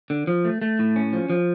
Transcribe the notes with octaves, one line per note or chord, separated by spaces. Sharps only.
D3
F3
A3
A3
A2
C#4
F3
F3